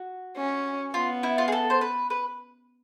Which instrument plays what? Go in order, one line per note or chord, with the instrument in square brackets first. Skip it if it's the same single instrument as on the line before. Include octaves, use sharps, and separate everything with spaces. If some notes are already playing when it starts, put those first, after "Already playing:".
Already playing: [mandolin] F#4
[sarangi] C#4
[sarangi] B3 [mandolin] F4
[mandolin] E4
F4
G#4
A4
C5
B4
B4